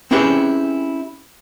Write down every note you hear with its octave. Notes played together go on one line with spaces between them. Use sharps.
C4 C#4 E4 G4 G#4 B4